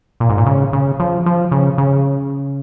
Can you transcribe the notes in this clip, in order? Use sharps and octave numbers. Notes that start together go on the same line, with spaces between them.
A#2
G#2
A#2
C#3
C#3
F3
F3
C#3
C#3